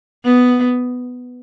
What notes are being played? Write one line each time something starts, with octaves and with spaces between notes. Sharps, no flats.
B3